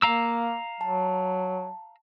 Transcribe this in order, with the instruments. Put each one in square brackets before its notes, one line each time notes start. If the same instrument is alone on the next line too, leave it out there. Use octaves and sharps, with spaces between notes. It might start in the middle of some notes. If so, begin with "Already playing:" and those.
[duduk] A#3 [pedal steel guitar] F5 A#5 E6
[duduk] F#3 [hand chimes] A5